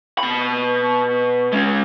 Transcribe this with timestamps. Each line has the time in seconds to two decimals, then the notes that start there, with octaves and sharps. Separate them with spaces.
0.18 B2 B5
1.53 G#3 C#4